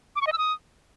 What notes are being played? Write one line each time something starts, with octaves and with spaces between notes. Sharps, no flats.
D6
C#6
D#5
E6
D#6